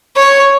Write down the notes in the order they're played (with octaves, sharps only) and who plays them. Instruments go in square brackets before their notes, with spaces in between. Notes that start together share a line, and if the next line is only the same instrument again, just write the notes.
[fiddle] C#5